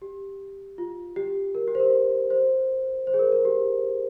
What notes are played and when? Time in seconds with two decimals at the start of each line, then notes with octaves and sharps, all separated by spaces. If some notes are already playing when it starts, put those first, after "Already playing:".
0.02 G4
0.78 F4
1.16 G4
1.55 A#4
1.68 G4
1.75 C5
1.80 A#4
2.30 C5
3.07 C5
3.14 G#4
3.19 A#4
3.32 A#4
3.45 G4